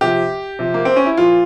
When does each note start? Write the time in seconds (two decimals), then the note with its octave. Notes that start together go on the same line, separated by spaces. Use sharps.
0.01 C3 F3 G4
0.59 C3 F3
0.74 A#3
0.85 C4
0.96 C#4
1.06 E4
1.17 A#2 F3 F4